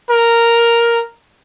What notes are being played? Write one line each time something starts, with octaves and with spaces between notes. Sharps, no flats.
A#4